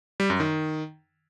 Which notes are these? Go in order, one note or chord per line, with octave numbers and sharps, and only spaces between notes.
G3
F#2
D#3